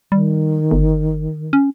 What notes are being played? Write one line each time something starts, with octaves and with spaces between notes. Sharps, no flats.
D#3 G3
G1
C#4